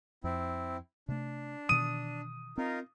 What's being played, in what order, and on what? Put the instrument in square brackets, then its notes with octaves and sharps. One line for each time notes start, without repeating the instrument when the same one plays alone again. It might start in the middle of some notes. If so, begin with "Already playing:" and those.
[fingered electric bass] F2 [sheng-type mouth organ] C4 E4
[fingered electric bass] C3 A3 [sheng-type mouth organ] D4
[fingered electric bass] B2 D#3 E3 [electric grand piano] D#6 D#7
[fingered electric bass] C4 [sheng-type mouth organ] D#4 F4 A#4